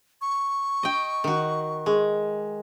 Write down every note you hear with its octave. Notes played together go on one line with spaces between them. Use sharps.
C#6
D#5 G5
D#3 F#4
G#3